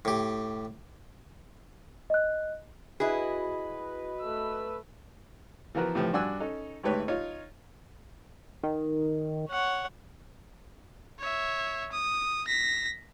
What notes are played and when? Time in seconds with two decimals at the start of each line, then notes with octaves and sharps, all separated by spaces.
0.05 A2 G4
2.10 D#5 F#6
3.00 E4 F#4 G#4 B4 D#5
4.21 A3 E6
5.75 E3 F3 B3 F#4 A#4 B4
5.95 A2 C3 E3 F3
6.13 G2 D4 F#4 G#5 E6
6.40 C#4 D#4 A4
6.83 G#1 D2 G#2 G4 B4 C#5
7.08 D#4 F4 C#5
8.63 D#3
9.49 C#5 F#5
11.19 C#5 E5
11.92 D#6
12.47 A#6 B6